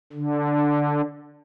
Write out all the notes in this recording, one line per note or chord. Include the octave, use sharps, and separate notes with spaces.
D3